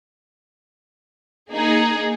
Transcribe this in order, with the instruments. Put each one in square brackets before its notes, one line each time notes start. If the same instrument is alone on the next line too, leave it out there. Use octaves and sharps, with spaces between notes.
[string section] A#3 D#4 G#4